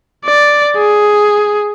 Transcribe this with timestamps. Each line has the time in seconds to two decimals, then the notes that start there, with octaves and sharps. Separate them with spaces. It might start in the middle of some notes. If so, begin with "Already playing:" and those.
0.25 D5
0.77 G#4